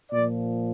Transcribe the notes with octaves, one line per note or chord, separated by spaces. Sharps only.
A#2 F3 D5